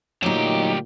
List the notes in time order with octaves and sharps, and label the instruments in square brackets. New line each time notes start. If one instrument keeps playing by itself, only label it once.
[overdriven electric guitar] D2 G4 [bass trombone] A#2 [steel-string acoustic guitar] F#3 D#4